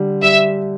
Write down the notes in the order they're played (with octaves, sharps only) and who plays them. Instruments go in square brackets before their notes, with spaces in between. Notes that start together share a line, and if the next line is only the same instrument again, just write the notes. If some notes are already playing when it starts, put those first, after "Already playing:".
Already playing: [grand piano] D3 G3
[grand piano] G3 [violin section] E5